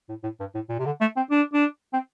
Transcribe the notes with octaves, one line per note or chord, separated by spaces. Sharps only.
A2
A2
G2
A2
A#2
C3
D3
A3
C4
D4
D4
C4